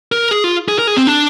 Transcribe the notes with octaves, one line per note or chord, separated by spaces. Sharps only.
A#4
G#4
F4
G#4
A#4
G#4
C4
D4